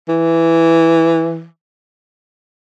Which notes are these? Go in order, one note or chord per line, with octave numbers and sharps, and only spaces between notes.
E3